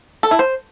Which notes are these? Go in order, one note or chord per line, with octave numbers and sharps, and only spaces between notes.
A4
E4
C5